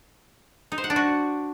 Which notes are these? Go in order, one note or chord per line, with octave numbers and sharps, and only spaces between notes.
D#4
C5
F#5
D4
F#4